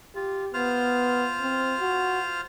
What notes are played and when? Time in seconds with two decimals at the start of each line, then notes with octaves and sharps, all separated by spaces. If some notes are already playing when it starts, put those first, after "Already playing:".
0.15 F4 G4
0.54 B3 F4 C5 F6
1.41 C4
1.80 F#4